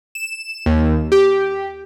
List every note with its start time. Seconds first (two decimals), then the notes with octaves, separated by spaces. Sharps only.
0.15 E7
0.66 D#2
1.12 G4